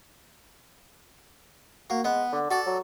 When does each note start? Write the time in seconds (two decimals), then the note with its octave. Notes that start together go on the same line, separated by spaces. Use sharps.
1.90 A#3 F#4
2.04 G#3 B3
2.33 D3
2.51 F#4 A4 D5
2.66 F#3